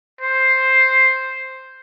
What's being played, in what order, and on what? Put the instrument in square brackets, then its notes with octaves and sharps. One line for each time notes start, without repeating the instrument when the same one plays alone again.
[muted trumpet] C5